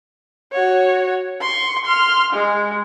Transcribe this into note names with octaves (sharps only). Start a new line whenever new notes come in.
F#4 C#5
C6 C#6
C6 F6
G#3